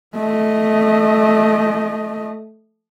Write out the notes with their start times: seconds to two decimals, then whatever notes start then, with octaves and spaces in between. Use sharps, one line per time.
0.15 A3 D#5